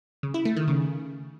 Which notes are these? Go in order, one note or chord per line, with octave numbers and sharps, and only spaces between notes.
C#3
E4
A3
D#3
C#3